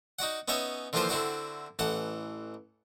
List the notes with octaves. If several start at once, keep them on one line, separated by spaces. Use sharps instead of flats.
D#4 F#4 D5 F#5
B3 C#4 D#4 C#5 E5 G#5
D3 E3 F3 A#3 F4 C5
D3 C4 E4 F#4 D5
A1 E3 A4 F#5